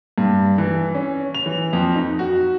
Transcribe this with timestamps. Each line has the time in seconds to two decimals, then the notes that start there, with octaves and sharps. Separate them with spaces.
0.18 G2
0.58 E3
0.95 C#4
1.35 F7
1.46 E3
1.73 F2
1.95 D#4
2.19 F#4